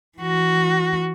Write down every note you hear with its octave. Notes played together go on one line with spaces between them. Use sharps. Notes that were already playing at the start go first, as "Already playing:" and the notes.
E3 F#4